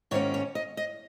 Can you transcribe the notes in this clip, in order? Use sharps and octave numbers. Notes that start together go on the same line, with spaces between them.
G#2 D#3 A#3 C#4 C#5
C#5
D#5
D#5